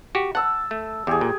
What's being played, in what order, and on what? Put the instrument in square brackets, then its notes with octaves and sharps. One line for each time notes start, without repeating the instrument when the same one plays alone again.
[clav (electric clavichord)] F#4 G4
[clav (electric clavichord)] F#5 [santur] A5 E6
[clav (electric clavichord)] A3
[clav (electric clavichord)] E2 [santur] G4 G#4
[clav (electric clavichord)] A#2